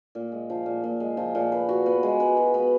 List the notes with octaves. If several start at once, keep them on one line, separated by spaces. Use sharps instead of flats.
A#2
G#3
F3
A#2
A#2
G#3
F3
A#2
B4
F#4
B3
G#3
B4
F#4
B3